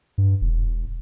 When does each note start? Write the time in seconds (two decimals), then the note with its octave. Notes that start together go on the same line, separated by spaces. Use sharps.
0.18 G2
0.41 E1